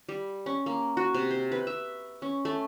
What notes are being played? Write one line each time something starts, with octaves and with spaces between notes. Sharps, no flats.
G3
C#4
A#3
F#4
C3
C5
B4
E5
C#4
A3